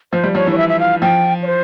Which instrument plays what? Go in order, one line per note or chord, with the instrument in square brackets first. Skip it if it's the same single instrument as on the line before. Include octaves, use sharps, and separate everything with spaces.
[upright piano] F3 [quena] C5
[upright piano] G3
[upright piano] F3 [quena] C#5
[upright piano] E3
[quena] C#5
E5
E5
F5
[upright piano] F3 [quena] G5
[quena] C#5
C5